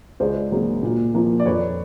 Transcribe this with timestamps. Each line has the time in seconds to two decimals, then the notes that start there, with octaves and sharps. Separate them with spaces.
0.20 C#2 C5 D5
0.51 C#3 F#3 A#3
0.83 A#2
1.14 F3 A#3
1.40 D5
1.46 F2 B4 C#5